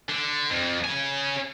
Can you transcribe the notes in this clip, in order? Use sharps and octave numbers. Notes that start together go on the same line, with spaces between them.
D3
F2
C#3 G#5